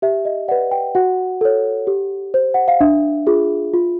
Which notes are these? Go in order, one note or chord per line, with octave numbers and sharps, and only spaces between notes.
G4 E5
D#5
B4 D5 F#5
G5
F#4 F#5
A4 C#5
G4
C5
F#5
F5
D4 E5
F4 G#4
F4